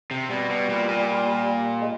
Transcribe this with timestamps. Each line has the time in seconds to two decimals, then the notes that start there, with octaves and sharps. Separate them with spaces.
0.11 C3
0.30 B2 G3
0.50 B2
0.70 A#2
0.89 A#2
1.82 G#3